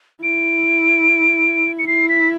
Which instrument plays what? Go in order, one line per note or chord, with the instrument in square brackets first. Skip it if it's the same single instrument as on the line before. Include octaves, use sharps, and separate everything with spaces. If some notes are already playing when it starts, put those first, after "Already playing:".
[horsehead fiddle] E4 [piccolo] D7
[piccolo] C#7
[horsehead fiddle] E4 [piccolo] C7
[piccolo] B6